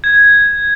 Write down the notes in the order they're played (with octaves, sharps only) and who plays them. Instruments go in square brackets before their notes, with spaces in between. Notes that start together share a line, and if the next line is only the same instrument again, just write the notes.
[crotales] G#6